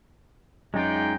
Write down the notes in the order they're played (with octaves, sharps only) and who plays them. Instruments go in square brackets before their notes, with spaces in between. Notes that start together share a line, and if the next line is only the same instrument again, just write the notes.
[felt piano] F#2 [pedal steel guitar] G#3 D#4 [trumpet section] F4 D5 G5